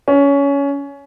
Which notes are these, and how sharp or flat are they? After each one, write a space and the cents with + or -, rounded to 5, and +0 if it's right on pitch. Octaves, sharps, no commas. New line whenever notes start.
C#4 +20